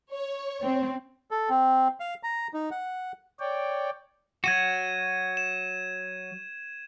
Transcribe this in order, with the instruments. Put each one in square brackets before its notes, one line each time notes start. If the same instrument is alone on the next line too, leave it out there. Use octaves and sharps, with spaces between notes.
[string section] C#5
[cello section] C4
[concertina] A4
C4
F5
A#5
D#4
F#5
[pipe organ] C#5 D5 G5
[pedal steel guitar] F#3 F#4 [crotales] G#6 D#7 E7
[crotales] E7